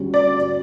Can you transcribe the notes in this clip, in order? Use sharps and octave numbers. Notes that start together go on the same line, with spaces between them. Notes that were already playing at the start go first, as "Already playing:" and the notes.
Already playing: D2 D3 G3 C#4 G4
D5